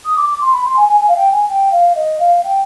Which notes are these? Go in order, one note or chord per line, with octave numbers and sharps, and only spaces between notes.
D#6
D6
D6
C6
B5
C6
G#5
G#5
G#5
F5
G5
G#5
G5
F5
D#5
F5
G5